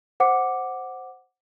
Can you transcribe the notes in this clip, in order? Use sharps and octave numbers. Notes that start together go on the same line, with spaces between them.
C5 F#5 D6 C#7